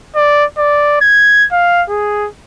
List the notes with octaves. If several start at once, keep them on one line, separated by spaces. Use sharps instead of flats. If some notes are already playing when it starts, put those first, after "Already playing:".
D5
D5
G#6
F5
G#4